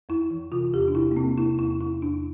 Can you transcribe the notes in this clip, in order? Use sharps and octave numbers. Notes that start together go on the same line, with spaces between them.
F2 E4
E3
C3 F4
E2 G4
D4
C3 E4
A#3
C3 C4
C3 E4
E2 E4
E2 E4
E2 D4